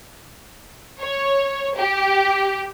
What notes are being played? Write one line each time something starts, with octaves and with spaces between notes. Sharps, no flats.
C#5
G4